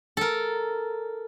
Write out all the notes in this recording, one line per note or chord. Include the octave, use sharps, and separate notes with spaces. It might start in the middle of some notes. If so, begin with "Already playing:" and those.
A4 A#4